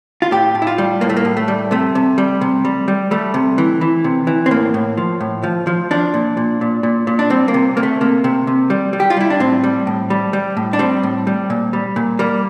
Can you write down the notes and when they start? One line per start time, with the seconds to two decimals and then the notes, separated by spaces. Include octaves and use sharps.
0.22 F4
0.31 A2 G4
0.55 A2
0.62 E4
0.67 F4
0.78 G3
1.01 A2 A#3
1.10 A3
1.17 A#3
1.25 A2
1.37 A3
1.48 G3
1.71 C3 A3
1.95 C3
2.18 G3
2.41 C3
2.65 G3
2.88 G3
3.11 G3 A3
3.34 C3
3.58 E3
3.81 E3
4.04 C3
4.27 E3
4.46 C4
4.51 A2 A#3
4.74 A2
4.97 F3
5.20 A2
5.44 F3
5.67 F3
5.91 F3 D4
6.14 A#2
6.37 A#2
6.61 A#2
6.83 A#2
7.07 A#2
7.19 D4
7.30 G3 C4
7.48 A#3
7.54 C3
7.77 C3 A#3
7.83 A3
8.01 C3 A#3
8.24 C3
8.47 C3
8.70 G3
8.93 G3
9.00 G4
9.10 F4
9.17 G3 E4
9.30 D4
9.40 A2 C4
9.64 G3
9.87 A2
10.10 G3
10.33 G3
10.57 A2
10.73 D4
10.79 G3 C4
11.03 A2
11.27 G3
11.50 A#2
11.73 G3
11.96 A#2
12.19 G3 A#3